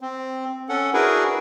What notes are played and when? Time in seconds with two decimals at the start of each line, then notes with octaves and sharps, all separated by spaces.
0.01 C4
0.69 C#4 A4 F#5
0.93 D4 E4 F#4 G#4 A#4 B4